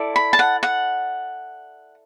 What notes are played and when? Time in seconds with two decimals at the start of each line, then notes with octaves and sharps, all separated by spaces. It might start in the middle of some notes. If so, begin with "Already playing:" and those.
Already playing: E4 A4 D5
0.16 B5
0.33 A5
0.39 F#5
0.63 F#5